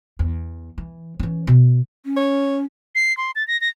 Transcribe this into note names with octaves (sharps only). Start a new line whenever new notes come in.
E2
E3
E3 C#4
B2
C#4
C#5
C7
C6
A6
A#6
A#6